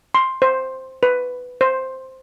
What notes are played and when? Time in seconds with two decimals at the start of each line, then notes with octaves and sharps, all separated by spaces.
0.15 C6
0.42 C5
1.03 B4
1.61 C5